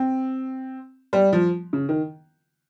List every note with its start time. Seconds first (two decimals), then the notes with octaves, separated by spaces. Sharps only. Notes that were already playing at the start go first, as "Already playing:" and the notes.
Already playing: C4
1.13 G3
1.33 F3
1.73 C#3
1.89 D#3